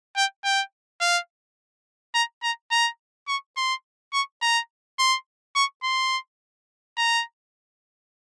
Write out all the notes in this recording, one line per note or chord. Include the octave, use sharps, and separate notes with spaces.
G5
G5
F5
A#5
A#5
A#5
C#6
C6
C#6
A#5
C6
C#6
C6
A#5